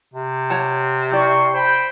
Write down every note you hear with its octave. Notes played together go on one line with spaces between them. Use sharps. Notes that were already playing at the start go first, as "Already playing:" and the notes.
C3
C#5 F#5 A5
E4 G4 D5 C6 C#6
C5 G5 B5